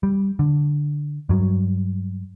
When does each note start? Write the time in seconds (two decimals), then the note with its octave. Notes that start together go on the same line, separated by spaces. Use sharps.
0.03 G3
0.39 D3
1.29 G2 F#3